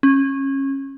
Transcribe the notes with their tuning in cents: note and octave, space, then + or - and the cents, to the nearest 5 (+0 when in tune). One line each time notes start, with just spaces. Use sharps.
C#4 -25